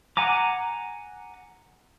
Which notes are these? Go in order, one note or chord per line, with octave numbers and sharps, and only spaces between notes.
F#5 G#5 A#5 D6